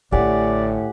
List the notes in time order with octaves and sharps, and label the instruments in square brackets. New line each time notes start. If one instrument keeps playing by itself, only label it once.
[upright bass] A1 D3 [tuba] A2 [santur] G4 F#5 G#5 [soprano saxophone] D5